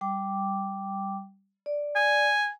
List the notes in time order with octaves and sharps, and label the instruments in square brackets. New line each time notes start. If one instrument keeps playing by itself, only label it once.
[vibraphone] G3 G5 D6
D5
[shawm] G#5